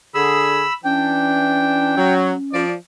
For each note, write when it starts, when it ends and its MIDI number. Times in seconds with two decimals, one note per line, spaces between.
0.15 0.65 50
0.15 0.65 68
0.15 0.73 83
0.15 0.73 88
0.84 1.95 52
0.84 2.64 61
0.84 1.95 62
0.84 2.14 79
1.97 2.31 54
2.52 2.72 53
2.52 2.72 74